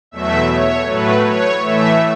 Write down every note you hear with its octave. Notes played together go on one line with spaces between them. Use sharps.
E2 B2 F#3 A3 E5
C#5
A2 F#3 A3 B4
C#5
A2 E3 A3 E5